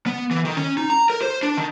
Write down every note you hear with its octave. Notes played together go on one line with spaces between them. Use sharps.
B3
E3
D#3
C#4
D#4
A#5
A#4
C5
D4
D#3